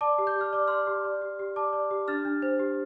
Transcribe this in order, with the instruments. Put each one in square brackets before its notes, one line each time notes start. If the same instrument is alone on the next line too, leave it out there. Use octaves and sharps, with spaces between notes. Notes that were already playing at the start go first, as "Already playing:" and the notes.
[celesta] D5 A5 D6
G4
G6
G4
F6
D5 D6
D5 C6 F6
G4
D5
G4
G4
D5 A5 D6
D5
G4
D4 F6 A6
D4
C5
G4